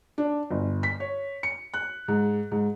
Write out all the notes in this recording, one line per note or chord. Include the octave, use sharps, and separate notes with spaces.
D4
G1
B6
C#5
C#7
F#6
G#2
G#2